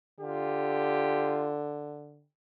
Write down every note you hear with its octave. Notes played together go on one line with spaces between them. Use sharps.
D3 F4 G4